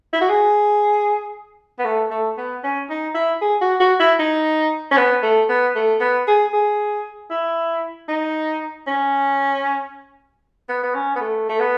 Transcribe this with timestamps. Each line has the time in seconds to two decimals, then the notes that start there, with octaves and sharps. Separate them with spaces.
0.13 E4
0.21 F#4
0.29 G#4
1.79 B3
1.84 A3
2.10 A3
2.38 B3
2.63 C#4
2.89 D#4
3.14 E4
3.41 G#4
3.61 F#4
3.80 F#4
3.99 E4
4.19 D#4
4.91 C#4
4.97 B3
5.22 A3
5.49 B3
5.75 A3
6.00 B3
6.27 G#4
6.53 G#4
7.30 E4
8.08 D#4
8.87 C#4
10.68 B3
10.83 B3
10.94 C#4
11.15 B3
11.21 A3
11.49 A3
11.59 B3